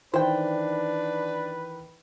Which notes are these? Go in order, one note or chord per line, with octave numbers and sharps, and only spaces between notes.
D#3 E3 D4 B4 C5 G5